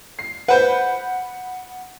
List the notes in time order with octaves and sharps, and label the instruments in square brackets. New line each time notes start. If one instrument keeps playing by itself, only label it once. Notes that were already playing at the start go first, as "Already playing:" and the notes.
[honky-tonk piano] C7
[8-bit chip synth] B4 C5 [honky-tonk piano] F#5 B5 G6